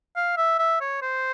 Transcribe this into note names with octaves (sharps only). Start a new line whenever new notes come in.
F5
E5
E5
C#5
C5